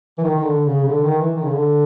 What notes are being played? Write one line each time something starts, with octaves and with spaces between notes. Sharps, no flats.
E3
D#3
D#3
D3
C#3
C#3
D3
D#3
E3
D#3
C#3
D3